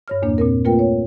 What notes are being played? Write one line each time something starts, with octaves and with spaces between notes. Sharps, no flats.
G2 C#5 F6
E2 A#2 A#3 D4
A#2 C4 A#4
A3 A#3 F4 A#4 B4 G5
C#5